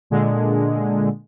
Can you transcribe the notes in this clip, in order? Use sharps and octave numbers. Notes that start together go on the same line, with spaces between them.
A#2 D3 G#3